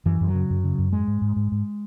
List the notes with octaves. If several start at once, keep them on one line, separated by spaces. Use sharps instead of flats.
F#2 E3
F#2
F#3
C#3
F#2
C#3
F#2
G#2 G#3
G#2
G#2
G#2
G#2